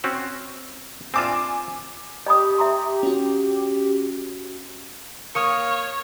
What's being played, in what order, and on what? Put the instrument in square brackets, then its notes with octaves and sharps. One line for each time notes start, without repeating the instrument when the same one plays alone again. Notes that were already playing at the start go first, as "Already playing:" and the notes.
[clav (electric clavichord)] C4 C#4 F#4
[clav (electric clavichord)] C4 D4 F4 [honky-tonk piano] G#5 D6 E7
[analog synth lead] G4 [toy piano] D#5 B5 D#6
[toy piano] E5 A#5 C6
[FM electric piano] C#4 F#4
[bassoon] A#3 [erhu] C#5 [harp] C#6 D#6 F6